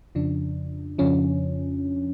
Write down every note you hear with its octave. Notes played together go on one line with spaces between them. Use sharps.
F2 C#3 F3 D4
F2 C#3 F3 C#4